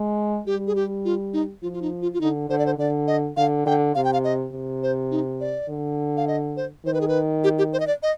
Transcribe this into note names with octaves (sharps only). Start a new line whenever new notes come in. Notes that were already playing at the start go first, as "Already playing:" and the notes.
Already playing: G#3
G3 G4
G#4
G4
F4
D#4
F3 F4
F4
D#4
F4
F4
D3 D#4
D3 C5
D5
C5
D3 D5
D#5
D3 F5
D3 G5
C3 F5
G5
F5
D#5
C3
C5
D#4
D5
D3
F5
D#5
C5
D#3 C5
B4
G#4
B4
G4
G4
C5
D#5
D5
D#5